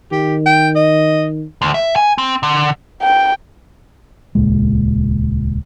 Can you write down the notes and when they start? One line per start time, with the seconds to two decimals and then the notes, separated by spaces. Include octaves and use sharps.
0.12 D#3 G4
0.46 G5
0.76 D#5
1.62 D2
1.74 E5
1.96 G#5
2.18 C4
2.43 D3
3.02 G5
4.35 D#1 C#2 A#2 G#3